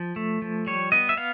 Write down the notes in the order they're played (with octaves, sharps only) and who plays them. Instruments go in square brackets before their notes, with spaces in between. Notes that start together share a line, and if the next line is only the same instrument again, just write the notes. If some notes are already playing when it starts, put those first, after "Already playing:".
Already playing: [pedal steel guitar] F3
A3
F3
G3 C#5
B3 D#5
E5
B3 F5